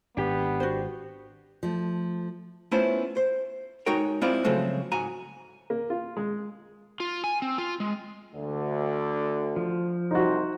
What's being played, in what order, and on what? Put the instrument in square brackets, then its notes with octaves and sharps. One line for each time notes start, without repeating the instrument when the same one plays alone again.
[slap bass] G#1 [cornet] B3 [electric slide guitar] D4 G4
[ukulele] F#4 C5
[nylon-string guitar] F3 A3
[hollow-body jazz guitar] A3 B3 C#4 E4 F4 C5
C5
G#3 D#4 F#4 A#4 C#5 G5
G#3 C4 E4 F4 D5
C#3 F3 F#3 G#3 A3 C4
G#2 F#4 G#5 A#5
[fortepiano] A#3
F4
G#3
[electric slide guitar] F4
G#5
C4
F4
G#3
[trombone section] D2 D3
[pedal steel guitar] F3
[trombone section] C2 C5 [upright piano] D#4 F#4